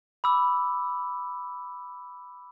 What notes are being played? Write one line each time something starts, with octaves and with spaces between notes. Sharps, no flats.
B5 D6 E6